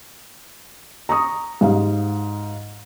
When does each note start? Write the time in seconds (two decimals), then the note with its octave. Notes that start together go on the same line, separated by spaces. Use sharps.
1.09 A#5 C#6 D#6
1.61 G#2 G4 F5